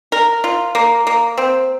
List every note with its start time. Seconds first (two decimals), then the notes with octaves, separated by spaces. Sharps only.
0.12 A#4
0.44 F4
0.75 A#3
1.07 A#3
1.38 C4